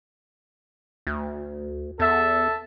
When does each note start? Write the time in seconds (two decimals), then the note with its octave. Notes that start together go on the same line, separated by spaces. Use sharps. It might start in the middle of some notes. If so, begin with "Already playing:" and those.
1.07 D2
1.99 E2 A4 E5 A5